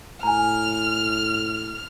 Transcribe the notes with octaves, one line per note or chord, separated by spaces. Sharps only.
A2 G#5 A#5 F6